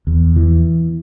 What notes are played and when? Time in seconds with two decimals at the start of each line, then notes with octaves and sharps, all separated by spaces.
0.07 E2
0.36 E3